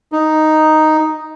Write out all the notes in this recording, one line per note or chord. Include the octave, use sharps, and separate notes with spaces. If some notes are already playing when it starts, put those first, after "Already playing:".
D#4